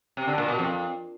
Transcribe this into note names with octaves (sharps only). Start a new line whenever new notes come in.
C3
D3
A#2
B2
F2